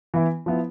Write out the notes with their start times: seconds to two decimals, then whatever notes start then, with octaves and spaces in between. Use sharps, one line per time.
0.14 E3 B3 E4
0.46 F3 B3 E4